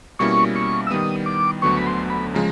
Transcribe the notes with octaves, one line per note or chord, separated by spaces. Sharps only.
B2 G3 A#3 C#4 E4 C#6
C#6
E6
D#3 G3 B3 D#6
D6
D2 D3 F#3 B3 C#6
B5
C6
B5
C#3 F3 G#3 A#5